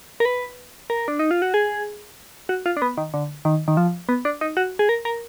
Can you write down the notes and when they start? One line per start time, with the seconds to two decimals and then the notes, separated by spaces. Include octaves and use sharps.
0.20 A#4
0.25 B4
0.90 A#4
1.08 D4
1.19 D#4
1.31 F4
1.42 F#4
1.54 G#4
2.49 F#4
2.66 F4
2.77 D4
2.82 B3
2.98 D#3
3.14 D3
3.45 D#3
3.68 D#3
3.77 F3
4.09 B3
4.25 D4
4.41 D#4
4.57 F#4
4.79 G#4
4.89 A#4
5.05 A#4